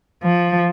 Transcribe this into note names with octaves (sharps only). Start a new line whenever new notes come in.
F3